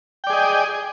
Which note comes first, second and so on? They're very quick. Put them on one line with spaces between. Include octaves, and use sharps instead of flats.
G5 D5 G#4 D#5